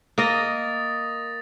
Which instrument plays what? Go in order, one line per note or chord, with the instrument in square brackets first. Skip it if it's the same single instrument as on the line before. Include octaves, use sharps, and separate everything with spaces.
[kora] A#3 D#5 [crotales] D#6 A6 A#6